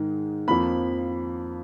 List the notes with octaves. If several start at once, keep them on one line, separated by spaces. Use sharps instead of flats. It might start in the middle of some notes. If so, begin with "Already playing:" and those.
Already playing: G#2 D#3 G#3
F2 F3 A#3 B5